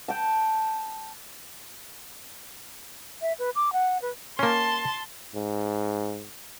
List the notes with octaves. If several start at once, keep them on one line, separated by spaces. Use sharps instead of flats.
G5 A5
E5
B4
D6
F#5
B4
A#3 C#4 A5 C6
G#2